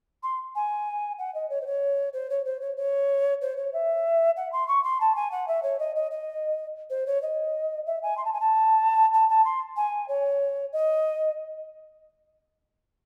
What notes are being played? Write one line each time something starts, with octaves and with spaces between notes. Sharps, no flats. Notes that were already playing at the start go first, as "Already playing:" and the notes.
C6
G#5
F#5
D#5
C#5
C5
C#5
C5
C#5
C5
C#5
C#5
C5
C#5
E5
F#5
C6
C#6
C6
A5
G#5
F#5
E5
C#5
D#5
D#5
D#5
C5
C#5
D#5
E5
G#5
C6
A5
G#5
A5
A5
A5
C6
G#5
C#5
D#5